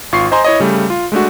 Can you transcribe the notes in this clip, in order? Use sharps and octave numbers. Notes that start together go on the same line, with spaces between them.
G#1 F4 C#6 C7
C5 D#5 G#5 A#5 C6
E4 C#5 D#5
C#3 G3 A3
F4
G#3 A3 D4 F#4